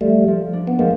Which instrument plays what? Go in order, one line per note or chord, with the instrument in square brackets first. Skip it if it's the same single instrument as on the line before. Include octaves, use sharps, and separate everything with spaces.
[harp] F3 [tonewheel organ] G3 A3
[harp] F3
D4
[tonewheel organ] B3
[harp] F3 [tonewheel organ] G#3 A#3